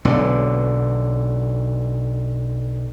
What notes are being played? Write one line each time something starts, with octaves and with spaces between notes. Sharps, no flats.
B1 D3